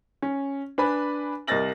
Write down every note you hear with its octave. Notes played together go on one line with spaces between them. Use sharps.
C#4
D4 B4 G#5 B5
C2 A#4 D#5 A6 A#6 F#7